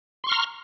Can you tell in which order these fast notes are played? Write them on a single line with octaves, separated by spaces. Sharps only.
C6 C#6 F6 A#5